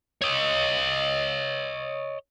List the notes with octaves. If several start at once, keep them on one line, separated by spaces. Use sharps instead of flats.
C#5 D#5